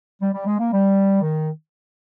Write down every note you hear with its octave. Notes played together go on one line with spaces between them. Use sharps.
G3
G3
G#3
A#3
G3
D#3